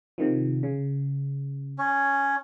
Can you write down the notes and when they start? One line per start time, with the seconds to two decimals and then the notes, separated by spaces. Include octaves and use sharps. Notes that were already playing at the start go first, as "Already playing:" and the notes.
0.18 C3 D#3 F3
0.63 C#3
1.78 C#4 C#5